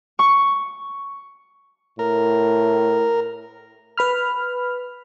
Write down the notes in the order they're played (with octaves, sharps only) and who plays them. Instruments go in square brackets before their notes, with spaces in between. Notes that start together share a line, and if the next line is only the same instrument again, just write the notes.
[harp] C#6
[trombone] A2 [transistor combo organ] A#4
[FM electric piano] B4 B5 F6